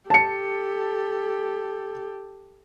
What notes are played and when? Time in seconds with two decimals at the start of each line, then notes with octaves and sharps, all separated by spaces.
0.10 G4 A4 A5 C#7